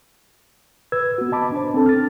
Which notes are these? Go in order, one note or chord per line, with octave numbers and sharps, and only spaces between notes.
B4 E6 G#6
B3 F#4
D#5 A5 B5 D6
D4 C5
C4 D4 A4 A5
F6 A6